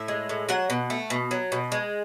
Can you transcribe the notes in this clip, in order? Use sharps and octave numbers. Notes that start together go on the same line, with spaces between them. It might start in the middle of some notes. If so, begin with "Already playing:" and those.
Already playing: A2 E5
G#3
A2
F#3 F#5
B2
A3
B2
F#3
B2
G#3